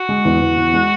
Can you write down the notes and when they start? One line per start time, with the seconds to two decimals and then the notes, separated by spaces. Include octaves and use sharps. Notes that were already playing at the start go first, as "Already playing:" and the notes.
Already playing: F#4
0.09 G#3
0.25 E2
0.42 E2
0.57 E2
0.73 G#3